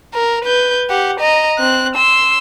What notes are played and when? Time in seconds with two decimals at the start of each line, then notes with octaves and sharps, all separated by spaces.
0.14 A#4
0.45 B4 G6
0.90 G4 F#5
1.20 D#5 A#5
1.59 C4 F#6
1.96 C6 E6